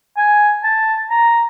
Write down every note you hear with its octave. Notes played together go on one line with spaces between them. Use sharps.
G#5
A5
A#5